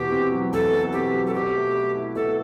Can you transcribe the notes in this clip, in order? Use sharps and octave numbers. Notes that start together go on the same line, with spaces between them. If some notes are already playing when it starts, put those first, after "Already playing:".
Already playing: E2 B2 G4
C4
F#3
E2 A4
B2
C4 G4
F#3
A4
B2 G4
A3
B4
E4
B2 A4